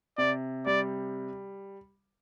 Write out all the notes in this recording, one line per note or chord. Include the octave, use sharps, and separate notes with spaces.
C3 D5
G3 D5